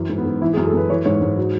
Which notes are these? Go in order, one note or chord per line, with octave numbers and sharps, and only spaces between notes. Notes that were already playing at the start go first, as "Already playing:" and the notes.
Already playing: F#2 E3
G#2
B3
G#2
E3 E4
G#4
F#2
A4
F#2 B4
E3 C#5
G#2 C#5
G#2
F#3